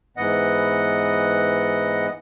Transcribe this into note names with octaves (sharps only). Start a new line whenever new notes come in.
G#2 E3 B3 D#5 F#5